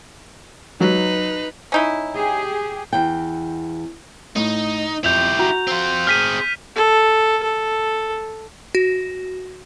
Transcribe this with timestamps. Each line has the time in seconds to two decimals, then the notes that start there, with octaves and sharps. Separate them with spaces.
0.80 F#3 D#4 F#4 B4
1.72 C#4 D#4 E4
2.15 G4 G#4
2.93 E2 G5
4.36 A2 D#4
5.04 F2 E4 G4 G6 F7
5.39 F#4 A#5
5.67 C4 F4
6.07 C4 G#4 F6 B6 D#7
6.76 A4
7.43 A4
8.75 F#4